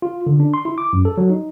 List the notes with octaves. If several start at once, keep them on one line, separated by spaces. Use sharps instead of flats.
F4
D3
D4
C6
E4
D6
F#2
A4
F#3
D#4